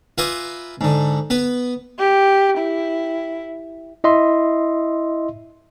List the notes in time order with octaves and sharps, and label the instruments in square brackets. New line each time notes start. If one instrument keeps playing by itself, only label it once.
[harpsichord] F4 B4 E5 G#5 A#5 D6
G#2 D3
B3 B4
[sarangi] G4
E4
[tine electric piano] E4 D#5 E5 C6